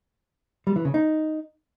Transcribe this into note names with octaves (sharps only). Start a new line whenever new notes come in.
G3
E3
C#3
D#4